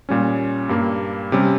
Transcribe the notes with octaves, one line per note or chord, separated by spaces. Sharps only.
A#2 G3 C#4
G2 G3 A#3
C3 G3 C#4